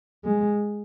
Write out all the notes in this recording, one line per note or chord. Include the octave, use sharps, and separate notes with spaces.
G#3